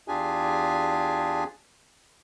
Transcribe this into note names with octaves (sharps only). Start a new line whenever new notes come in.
E2 D4 F4 G4 G#4 G#5